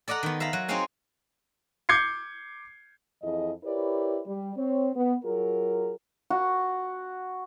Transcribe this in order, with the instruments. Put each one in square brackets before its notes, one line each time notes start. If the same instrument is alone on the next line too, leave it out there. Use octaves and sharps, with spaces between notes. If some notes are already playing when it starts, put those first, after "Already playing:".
[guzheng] A4 D5 D#5 F#5 A#5
D#3 B3
E5 F5 A#5 B5
F#3
C4 D#4 G#4 C#5 F5 G#5
[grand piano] D6 G6 G#6 C7 C#7
[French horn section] F2 E3 E4 G#4 D#5
E4 G4 A#4 B4 C#5 D5
G3
C4 C#5
B3
F#3 F4 G#4 A#4
[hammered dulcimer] F#4